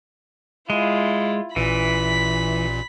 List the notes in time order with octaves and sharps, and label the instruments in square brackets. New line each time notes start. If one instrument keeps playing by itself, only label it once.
[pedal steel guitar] G#3 [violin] E4 F4
[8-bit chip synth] A1 A#2 [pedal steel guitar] E3 [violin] B5 B6